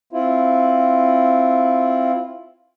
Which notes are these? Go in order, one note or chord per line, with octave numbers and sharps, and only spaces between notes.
C4 E4 F4